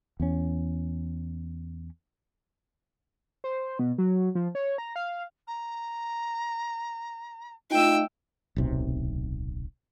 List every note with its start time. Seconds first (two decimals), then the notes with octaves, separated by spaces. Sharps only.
0.20 E2 C#4
3.44 C5
3.79 B2
3.98 F#3
4.35 F3
4.55 C#5
4.78 A#5
4.96 F5
5.47 A#5
7.71 A3 D#4 F4 G5 E6
8.56 D1 B1 C3